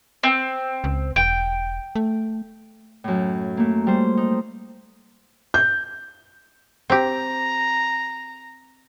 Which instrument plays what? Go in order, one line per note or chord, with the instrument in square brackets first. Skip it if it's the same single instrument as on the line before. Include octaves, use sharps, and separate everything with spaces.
[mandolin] C4
[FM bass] C#2
[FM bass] E1 [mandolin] G5
[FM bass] A3
[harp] F#2 A2
A3 A#3
G3 C5
D#4
[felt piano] G6
[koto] C4 G4 [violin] A#5